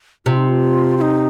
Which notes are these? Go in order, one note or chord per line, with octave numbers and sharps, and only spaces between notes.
C3 F4
D#4
F4
F4
D#4